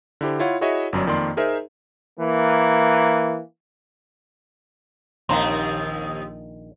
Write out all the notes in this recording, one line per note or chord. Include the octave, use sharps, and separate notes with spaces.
D3 E4 G4 C5
E4 F4 C#5 F#5
E4 F#4 G#4 C#5 D#5 E5
G1 F#2 F#3 D5
F2 D#3 A#3 D5 C6
D#4 G#4 A#4 C5 E5
E3 A#3
A#1 D#2 D#3 C4 F5 A#5 C6